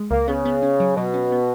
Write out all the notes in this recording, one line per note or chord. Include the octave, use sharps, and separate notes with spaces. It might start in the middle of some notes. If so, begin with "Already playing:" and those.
Already playing: G#3
C#2 A#3
C#3 B3
B3
C#4
F#3
B2 F#3
C#4
B3